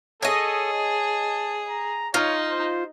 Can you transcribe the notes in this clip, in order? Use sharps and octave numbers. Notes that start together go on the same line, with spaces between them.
G#4 A4 C#5 D#5
A5
A#5
D#4 F4 C#5
C5